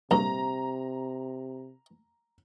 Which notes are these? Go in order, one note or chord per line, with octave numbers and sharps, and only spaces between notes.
A#1 G2 C3 A#5